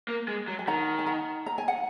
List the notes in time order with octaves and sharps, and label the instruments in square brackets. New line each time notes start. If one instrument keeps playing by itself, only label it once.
[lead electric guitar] A#3
G#3
F#3
[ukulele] G#5
[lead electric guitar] D#3 [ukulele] F#5 A#5
[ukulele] G#5
F#5 A#5
A#5
G#5
F#5